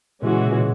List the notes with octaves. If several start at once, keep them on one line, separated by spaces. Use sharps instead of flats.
A#2 C#3 E3 G#3 C#4 F#4
B2
A#2 C#3